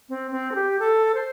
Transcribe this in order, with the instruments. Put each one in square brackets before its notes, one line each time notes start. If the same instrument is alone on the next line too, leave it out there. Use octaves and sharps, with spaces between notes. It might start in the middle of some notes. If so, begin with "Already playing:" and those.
[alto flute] C4
C4
A4
G4
A4
C5